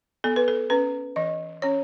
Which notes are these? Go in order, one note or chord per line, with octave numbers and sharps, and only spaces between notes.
B3 A4
B4
A4
C#4 B4
E3 D#5
C#4 C#5